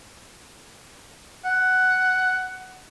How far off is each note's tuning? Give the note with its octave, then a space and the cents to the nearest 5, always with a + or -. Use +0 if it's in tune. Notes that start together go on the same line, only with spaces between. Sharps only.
F#5 +10